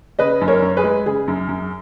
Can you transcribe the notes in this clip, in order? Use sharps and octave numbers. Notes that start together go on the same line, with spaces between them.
C#3 B4 D#5
F#2
A#4 C#5
F#2
G#4 B4
G#3
C#3 G#4
F#2
F#2